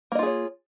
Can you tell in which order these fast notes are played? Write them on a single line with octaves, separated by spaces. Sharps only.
A#3 D#5 F4 G#4 C#5